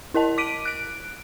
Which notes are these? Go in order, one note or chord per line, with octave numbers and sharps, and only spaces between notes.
E4 A#4 D#5 A5
D6 B6 D7 D#7
F#6 D7